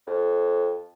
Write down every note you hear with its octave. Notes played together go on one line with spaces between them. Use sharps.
F2